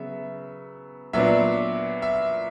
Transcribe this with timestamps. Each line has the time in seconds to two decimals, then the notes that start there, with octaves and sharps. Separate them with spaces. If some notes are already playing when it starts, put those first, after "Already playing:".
Already playing: C#3 F#3 B3 E5
1.13 A#2 F#3 B3 D4 E5
2.02 E5